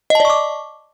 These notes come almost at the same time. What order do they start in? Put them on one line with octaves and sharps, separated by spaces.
D#5 A5 D5 C#6 D6